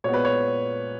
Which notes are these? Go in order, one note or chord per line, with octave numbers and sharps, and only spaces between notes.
A#2 G#3 B3 C#5
B4
C#5